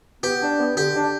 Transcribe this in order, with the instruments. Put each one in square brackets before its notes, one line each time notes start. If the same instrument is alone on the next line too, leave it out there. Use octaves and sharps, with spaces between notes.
[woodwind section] B3 [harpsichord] G4
[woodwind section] D4
B3
[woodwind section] D3 [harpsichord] G4
[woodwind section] D4